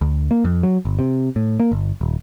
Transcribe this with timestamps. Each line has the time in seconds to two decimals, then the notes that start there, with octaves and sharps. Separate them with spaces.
0.01 D2
0.31 A#3
0.44 F2
0.63 F#3
0.85 G1
0.99 C3
1.36 A2
1.60 A#3
1.72 G1
2.01 D#1